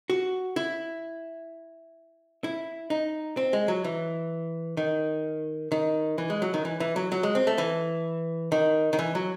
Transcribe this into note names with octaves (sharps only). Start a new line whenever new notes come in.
F#4
E4
E4
D#4
C4
G#3
F#3
E3
D#3
D#3
E3
G#3
F#3
D#3
E3
E3
F#3
F#3
G#3
C4
A3
E3
D#3
D#3
E3
F#3